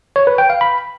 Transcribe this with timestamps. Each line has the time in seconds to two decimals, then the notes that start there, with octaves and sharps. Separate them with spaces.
0.16 C#5
0.27 B4
0.38 G5
0.50 F5
0.61 B5